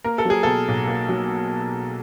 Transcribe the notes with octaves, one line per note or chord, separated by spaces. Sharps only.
A#3 A#4
A4
F#3 G#4
B2 A4
B1
A#3
F#3